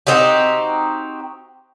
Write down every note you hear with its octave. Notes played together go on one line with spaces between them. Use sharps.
C4 D#4 F#4 G4